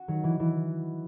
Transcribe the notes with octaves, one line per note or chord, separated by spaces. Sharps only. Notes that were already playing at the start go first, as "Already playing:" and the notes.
Already playing: F#4
D#3 F#3
E3
E3